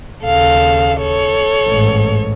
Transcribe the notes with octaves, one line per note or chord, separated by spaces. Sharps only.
D#2 C#3 A4 F5
A4 C#5
A1 G#2